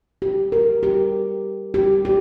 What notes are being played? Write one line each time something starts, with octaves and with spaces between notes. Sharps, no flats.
G4
A#4
G4
G4
G4